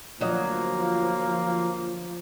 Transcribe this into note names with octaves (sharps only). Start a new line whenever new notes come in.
D2 F3 F#3 A#3 D#5